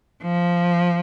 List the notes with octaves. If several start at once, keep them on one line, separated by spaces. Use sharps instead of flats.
F3